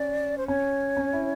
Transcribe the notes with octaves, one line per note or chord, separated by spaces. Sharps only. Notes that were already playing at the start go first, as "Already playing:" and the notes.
Already playing: C#4 D5
C5
C#4 C#5
C#4
E4